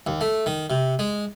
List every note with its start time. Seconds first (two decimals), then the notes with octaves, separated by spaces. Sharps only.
0.07 D#2
0.21 A3
0.46 D#3
0.70 C3
0.99 G#3